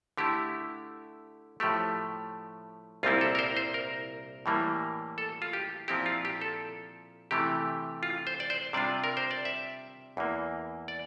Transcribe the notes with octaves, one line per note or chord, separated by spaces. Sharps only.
D3 A3 E4 G4
A2 F3 A3 G4
C2 A#2 G3 C4 E4 F4
A4
A#4
C5
C5
A#4
A2 E3 G3 A#3
A4
F4
G4
A#2 F3 C4 E4 G4
F4
G4
A4
C3 E3 A3 G4
F4
C5
D5
C5
C3 G3 D4 F4 D5
A#4
C5
D5
E5
E2 E3 A#3
D5